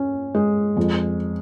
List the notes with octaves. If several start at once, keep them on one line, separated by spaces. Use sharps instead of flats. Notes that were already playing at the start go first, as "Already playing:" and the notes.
Already playing: C#4
G#3
F2